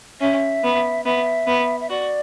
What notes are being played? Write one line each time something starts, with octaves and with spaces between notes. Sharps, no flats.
C#4 E5
B3
B3 E5
B3
E5
F#4 D5